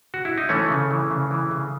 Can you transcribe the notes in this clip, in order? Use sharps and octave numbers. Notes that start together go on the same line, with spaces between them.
F#4
E4
D#4
E3 A3 C#4
C#3
E3
C#3
E3
C#3